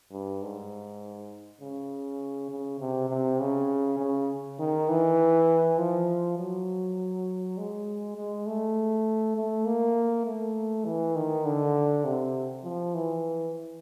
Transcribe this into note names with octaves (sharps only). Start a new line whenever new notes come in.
G2
G#2
C#3
C#3
C3
C3
C#3
C#3
D#3
E3
F3
F#3
G#3
G#3
A3
A3
A#3
A3
E3
D#3
D3
C3
F3
E3